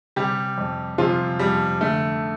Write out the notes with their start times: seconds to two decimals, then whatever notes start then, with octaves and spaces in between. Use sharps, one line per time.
0.16 C3 G3 G4
0.58 F2
0.98 C3 F3 F4
1.39 F2 G3
1.80 D3 A3